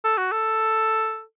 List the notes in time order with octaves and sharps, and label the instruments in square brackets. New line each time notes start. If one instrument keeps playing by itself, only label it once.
[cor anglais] A4
F#4
A4